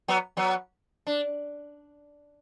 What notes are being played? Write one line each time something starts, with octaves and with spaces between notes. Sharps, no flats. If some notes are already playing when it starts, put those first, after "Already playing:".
F#3 B3
F#3 B3
D4